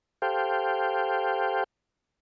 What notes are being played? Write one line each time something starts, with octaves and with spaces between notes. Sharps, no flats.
G4 A4 C5 F5 G5